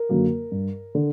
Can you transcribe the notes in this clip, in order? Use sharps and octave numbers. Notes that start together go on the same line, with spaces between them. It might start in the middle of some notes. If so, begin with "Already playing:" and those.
Already playing: A#4
F#2 D3 F#3 A#3
G2
D3